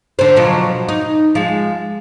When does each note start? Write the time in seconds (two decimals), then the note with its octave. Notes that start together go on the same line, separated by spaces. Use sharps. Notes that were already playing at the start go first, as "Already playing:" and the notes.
0.19 D3 C5
0.36 B2 F3 F#3
0.89 D#4
1.35 F3 G#3